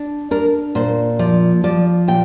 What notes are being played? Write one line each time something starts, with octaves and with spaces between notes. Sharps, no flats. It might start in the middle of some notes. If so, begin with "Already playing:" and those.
Already playing: D4
D4 A#4
A#2 C5
F3 D5
F3 D5
A#2 G5